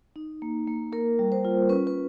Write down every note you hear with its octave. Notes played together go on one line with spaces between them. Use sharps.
D#4
A#3
A#3
A#3 A#4
G3
C5
F4
C#4 B4
B4